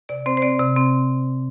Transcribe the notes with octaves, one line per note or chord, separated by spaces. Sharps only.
C3 D5
C4 C5
C5
C4 D5
C3
C4